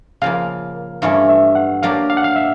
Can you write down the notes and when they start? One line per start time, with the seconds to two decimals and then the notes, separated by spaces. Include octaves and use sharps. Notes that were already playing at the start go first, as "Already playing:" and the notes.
0.22 C#3 F3 A#3 F5
1.02 G2 E3 A3 C#4 F5
1.29 E5
1.55 F#5
1.83 F#3 A#3 D4 G4 F5
2.10 F5
2.17 F#5
2.24 F5
2.36 E5